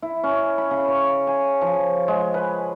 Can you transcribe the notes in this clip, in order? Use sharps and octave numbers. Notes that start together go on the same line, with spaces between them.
E4
C#4
B5
C#3
C#5
G#5
F3
G#3
B4